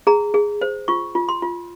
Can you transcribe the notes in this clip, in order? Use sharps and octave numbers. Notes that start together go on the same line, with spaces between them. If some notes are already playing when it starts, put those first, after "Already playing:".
G#4 A#5
G#4
C5
F4 C#6
F4
C6
F4